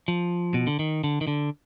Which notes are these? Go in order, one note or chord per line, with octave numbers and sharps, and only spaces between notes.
F3
B2
D3
D#3
D3
D#3
D3